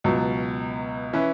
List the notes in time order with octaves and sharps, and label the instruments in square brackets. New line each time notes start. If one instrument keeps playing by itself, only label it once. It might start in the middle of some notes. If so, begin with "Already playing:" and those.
[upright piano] C#2 B2 F#3
E3 C#4 E4 B4